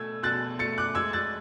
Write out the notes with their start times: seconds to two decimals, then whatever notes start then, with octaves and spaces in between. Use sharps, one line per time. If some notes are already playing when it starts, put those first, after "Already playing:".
Already playing: B2 A3 E6 G#6
0.23 B2 F#6 A6
0.59 A3 A6 C#7
0.78 D6 F#6
0.95 G#3 E6 G#6
1.13 F#6 A6